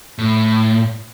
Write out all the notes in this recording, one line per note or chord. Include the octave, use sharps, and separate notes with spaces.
A2